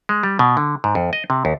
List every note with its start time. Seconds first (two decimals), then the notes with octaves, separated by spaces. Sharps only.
0.09 G#3
0.23 G3
0.39 B2
0.57 D3
0.84 G#2
0.95 F2
1.13 D#5
1.30 C3
1.45 D#2